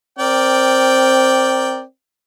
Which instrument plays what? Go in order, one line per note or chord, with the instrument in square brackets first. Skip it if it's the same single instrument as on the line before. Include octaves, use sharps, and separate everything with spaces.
[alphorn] C4 [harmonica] A#4 D5 G5